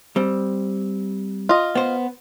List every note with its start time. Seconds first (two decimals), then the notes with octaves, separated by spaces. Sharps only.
0.16 G3 C4
1.49 F4 D#5
1.75 B3 C5